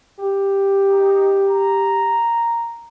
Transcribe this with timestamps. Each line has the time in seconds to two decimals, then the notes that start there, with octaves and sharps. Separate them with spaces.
0.18 G4
0.88 D#4
1.44 A#5